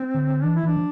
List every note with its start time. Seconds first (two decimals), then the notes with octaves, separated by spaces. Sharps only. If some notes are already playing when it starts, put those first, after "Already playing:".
Already playing: C4
0.15 D3
0.43 E3 D4
0.56 E4
0.63 E3 D4
0.77 F3